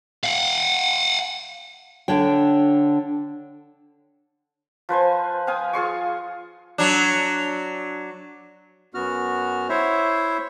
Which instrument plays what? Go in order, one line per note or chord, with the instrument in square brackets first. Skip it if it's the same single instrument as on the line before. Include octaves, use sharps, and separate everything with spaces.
[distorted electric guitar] F5 F#5
[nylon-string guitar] D3 D4 C#5 G5
[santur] F3 B4 C5 G#5
F5 G5 G#5 D#6
F4 G#4 C6 C#6
[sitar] F#3 D4
[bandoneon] F#2 B3 F#4 F6
E4 C5 C#5 E5